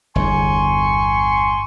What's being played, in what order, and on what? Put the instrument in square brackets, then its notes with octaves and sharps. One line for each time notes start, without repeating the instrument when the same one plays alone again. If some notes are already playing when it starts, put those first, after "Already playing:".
[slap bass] G1 E2 [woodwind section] G#5 C6 C#6